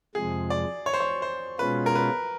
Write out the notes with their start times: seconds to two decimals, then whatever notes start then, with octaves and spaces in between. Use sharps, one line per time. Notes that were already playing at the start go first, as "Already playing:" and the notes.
0.15 F2 C3 F3 G#3 G#4
0.50 D5
0.86 C#5
0.94 C5
1.00 C#5
1.22 C5
1.59 B2 G#3 C#4 F4 B4
1.86 A#4
1.95 B4